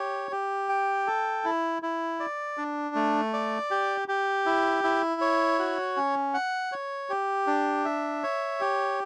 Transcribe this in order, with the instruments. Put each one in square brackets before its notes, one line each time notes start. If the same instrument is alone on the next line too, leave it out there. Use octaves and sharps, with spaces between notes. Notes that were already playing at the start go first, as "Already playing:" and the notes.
Already playing: [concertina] G4 C#5
G4
G5
A4
E4
E4
D5
D4
A3
D5
G4
G4
E4
E4
C#5
F#4
C#4
F#5
C#5
G4
D4
E5
C#5
G4